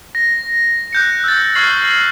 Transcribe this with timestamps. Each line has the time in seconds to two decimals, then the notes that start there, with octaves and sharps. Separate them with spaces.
0.15 A#6
0.93 F#6 G6 C#7
1.24 E6 A6
1.55 C#6 F6 G#6 A6 C7 F#7